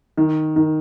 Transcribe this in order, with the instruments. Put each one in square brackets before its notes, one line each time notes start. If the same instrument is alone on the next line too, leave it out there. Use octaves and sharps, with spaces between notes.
[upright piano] D#3
D#3